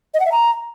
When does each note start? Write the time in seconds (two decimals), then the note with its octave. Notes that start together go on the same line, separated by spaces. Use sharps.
0.14 D#5
0.20 F#5
0.26 E5
0.32 A#5